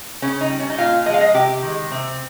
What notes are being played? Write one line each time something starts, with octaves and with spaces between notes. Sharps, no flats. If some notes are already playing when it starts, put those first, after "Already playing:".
C#3 C#4
D#4
G3
C#4
D#4
A#2 F4
F3 G#3 D#5 F5
D#5
C3 G4
D#3 G#3
C3 C4